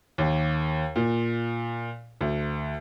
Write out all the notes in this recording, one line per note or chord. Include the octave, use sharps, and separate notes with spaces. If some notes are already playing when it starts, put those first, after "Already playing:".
D#2
A#2
D2